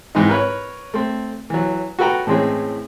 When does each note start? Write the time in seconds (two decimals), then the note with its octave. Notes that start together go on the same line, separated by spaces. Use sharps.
0.15 G#2 E3 C4 D#4
0.29 A#4 B4 C#5
0.94 A3 C4
1.50 E3 F#3
1.99 F#4 A4 B4 G5 A#5
2.27 A2 E3 G#3 C4 C#4 G#4